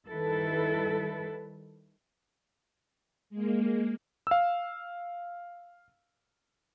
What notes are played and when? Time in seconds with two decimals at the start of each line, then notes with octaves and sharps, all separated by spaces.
0.10 D#3 G3 E4 A4 B4
3.30 G#3 A#3
4.27 F5 E6